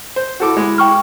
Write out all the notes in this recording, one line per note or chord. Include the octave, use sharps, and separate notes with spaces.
C5
E4 F#4 A4 D6
G#3
G5 C#6 F6